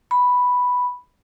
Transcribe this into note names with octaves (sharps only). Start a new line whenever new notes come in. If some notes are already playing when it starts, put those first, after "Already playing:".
B5